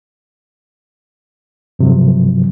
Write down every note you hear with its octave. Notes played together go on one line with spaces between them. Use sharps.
G2 C3 F3 F#3